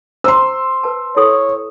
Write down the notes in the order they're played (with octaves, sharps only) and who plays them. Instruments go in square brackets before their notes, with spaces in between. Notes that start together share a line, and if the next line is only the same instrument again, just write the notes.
[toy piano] C5 A#5 [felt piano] C6 E6
[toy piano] B4 A5
[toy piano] E4 A4 D#6 [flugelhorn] C#5